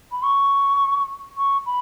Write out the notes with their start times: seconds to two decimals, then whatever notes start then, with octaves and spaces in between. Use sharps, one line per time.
0.12 B5
0.23 C#6
1.37 C#6
1.66 B5